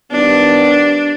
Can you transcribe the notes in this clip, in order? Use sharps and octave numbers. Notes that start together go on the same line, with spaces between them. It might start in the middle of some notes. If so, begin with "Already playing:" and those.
D#3 G3 B3 D4